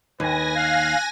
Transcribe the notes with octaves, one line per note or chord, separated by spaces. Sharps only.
D#2 B4 G#5 A#6
F5 F#6